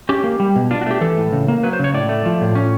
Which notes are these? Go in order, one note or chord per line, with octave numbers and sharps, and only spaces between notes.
C#4 G4
A#3
G3
B2
D4 F4
F#4
A3 G4
E3 A4
A2
C#3
A#3
F#3 B4
C5
C#3 C#5
A2 D5
A3
F3
A2
C#4